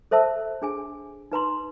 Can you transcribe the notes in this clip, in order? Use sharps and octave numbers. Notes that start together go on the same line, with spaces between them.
A4 C5 E5 A5 E6
D4 G#4 G#5
D#4 B4 A#5 C6